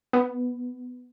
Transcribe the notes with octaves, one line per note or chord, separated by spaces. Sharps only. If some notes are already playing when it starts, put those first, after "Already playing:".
B3